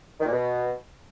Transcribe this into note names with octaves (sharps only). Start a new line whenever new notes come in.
D#3
A#2
B2